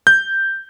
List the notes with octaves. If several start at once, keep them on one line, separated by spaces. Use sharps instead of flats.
G6